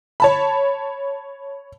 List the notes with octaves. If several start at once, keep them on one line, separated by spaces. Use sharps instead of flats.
C#5 A5 B5